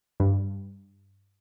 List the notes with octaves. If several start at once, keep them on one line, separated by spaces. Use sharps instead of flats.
G2